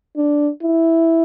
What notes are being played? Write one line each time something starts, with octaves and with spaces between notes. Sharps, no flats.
D4
E4